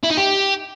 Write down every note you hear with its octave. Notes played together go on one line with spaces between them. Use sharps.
E4
D#4
G4